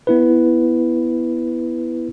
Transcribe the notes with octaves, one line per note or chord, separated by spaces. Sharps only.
B3 E4 B4